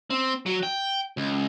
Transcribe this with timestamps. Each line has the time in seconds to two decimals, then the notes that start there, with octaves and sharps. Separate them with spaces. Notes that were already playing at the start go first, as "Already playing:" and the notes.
0.10 C4
0.46 F#3
0.63 G5
1.17 C#2